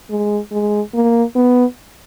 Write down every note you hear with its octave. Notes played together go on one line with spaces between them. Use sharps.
G#3
G#3
A#3
B3